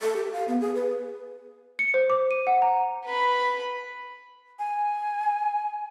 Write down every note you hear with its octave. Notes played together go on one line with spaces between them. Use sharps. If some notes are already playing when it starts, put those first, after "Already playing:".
A4
G4
F5
B3
G#4
B4
C#7
C5
D6
D#7
F#5
A#5
B4 B5
G#5